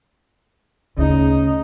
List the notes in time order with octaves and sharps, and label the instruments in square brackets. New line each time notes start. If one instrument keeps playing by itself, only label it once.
[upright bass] D2 [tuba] C#3 [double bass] D#4